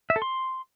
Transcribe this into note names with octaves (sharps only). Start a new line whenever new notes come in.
E5
A4
C6